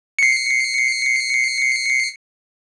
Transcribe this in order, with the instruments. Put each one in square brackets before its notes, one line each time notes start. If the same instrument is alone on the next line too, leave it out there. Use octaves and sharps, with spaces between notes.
[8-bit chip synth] C7 C#7